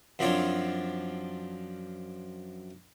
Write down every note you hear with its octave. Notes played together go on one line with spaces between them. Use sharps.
F#2 F3 C4 D4 F4 C#5